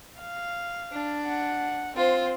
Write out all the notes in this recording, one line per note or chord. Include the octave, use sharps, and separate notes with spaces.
F5
D4
F#5
C4 F4 C5